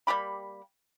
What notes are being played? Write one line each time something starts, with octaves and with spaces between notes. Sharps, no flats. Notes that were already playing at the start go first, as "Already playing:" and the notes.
G3 A#3 G4 B5